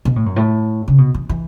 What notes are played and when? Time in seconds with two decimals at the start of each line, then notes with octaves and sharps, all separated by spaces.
0.05 B2
0.16 A2
0.26 F#2
0.36 A2
0.88 C#3
0.98 B2
1.14 E3
1.29 E3